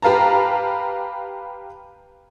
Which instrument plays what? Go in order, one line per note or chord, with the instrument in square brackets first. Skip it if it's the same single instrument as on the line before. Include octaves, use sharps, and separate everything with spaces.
[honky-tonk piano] G4 B4 F5 A5 A#5